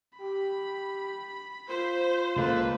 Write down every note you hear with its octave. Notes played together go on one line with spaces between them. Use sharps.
G4 B5
F4 C5
C#2 G#3 A#3 A4 B4